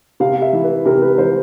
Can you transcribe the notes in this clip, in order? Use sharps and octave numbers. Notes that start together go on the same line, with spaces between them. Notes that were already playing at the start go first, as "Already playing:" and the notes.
C3 F5
E5
E3
B4
C3 A#4
B4
E3 C5